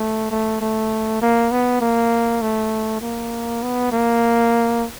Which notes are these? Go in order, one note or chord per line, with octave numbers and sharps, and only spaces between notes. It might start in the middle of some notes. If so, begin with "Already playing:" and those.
Already playing: A3
A3
A3
A#3
B3
A#3
A3
A#3
B3
A#3